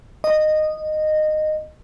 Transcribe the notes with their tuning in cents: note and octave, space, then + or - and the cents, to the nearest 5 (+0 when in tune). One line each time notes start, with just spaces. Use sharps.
D#5 -15